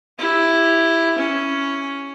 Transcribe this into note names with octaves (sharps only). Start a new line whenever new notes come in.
E4 G4
C#4